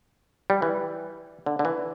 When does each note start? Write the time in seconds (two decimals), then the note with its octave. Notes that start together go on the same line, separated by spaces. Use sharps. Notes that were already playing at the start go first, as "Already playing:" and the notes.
0.50 G3
0.62 E3
1.46 D3
1.59 D3
1.65 E3